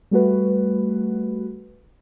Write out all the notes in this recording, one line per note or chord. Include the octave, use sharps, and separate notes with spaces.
G3 A3 F#4 B4